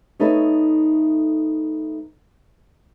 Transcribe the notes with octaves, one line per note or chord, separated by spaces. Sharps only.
A3 B3 D#4 A4 C#5 E5